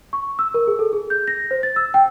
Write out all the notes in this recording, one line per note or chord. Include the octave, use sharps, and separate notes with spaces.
C#6
E6
A#4
G#4
A4
G#4
G6
A#6
C5
A6
E6
G5